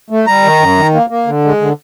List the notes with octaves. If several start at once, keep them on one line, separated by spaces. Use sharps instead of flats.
A3
G3 A#5
D#3
F#2
D#3
A#3
A#3
D3
G#3
D3